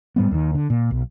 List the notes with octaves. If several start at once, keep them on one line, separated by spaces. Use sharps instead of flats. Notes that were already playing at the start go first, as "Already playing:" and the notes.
G#2 G3 B3
D#2 D#3
D3
A#2
B1